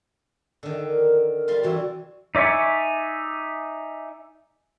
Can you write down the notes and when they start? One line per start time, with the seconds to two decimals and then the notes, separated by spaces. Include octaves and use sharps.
0.63 D3 D#3
0.87 A#4
1.33 A#4
1.48 G3 F4 C6
1.63 C3 E3 F#4
2.35 D#4 D5 E5 G#5 C#6